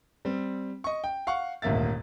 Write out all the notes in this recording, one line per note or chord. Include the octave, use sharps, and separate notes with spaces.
G3 C4
D#5 C#6
G5
F5 F#5 C#6
D#1 G#1 D2 A#3 E5 A6